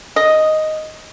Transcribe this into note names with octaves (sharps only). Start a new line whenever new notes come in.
D#5